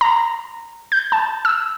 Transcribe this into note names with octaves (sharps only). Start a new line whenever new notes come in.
A#5
G6
A5
E6